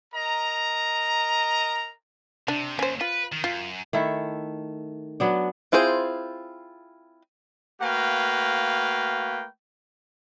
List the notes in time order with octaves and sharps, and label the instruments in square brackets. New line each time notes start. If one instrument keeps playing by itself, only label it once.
[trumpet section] A#4 D#5 A#5
[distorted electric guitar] C3 [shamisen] D4
[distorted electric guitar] D#2 [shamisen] C#4 C5
[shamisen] F4 [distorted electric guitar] B4
[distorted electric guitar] D#3
[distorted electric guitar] F#2 [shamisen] F4
[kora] D#3 A3 E4
F#3 B3 D4
[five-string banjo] C4 E4 F4 G#4 C5
[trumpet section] A3 A#3 F#4 B4 F5 G5